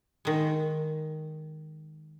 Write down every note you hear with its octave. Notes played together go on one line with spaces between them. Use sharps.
D#3 G#3